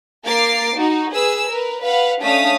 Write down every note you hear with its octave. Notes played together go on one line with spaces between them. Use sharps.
A#3 A#4 D6 A6 C7
D#4 F#4
G#4 B4 E6
A#4 B4
B4 F5 F#5 B5
A3 C#4 D4 F5 D#6 B6